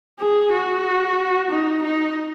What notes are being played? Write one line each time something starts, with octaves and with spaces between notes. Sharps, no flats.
G#4
F#4
D#4
D#4